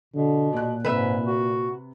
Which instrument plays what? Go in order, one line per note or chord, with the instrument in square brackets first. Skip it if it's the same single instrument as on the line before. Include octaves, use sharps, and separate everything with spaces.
[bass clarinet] B2 [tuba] D3
[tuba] A#2 [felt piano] D5 F#6
[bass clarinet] G#2 [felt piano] C3 [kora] B4 E5
[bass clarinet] F#4